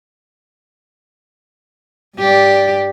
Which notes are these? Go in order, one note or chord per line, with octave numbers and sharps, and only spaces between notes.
G2 G4 D5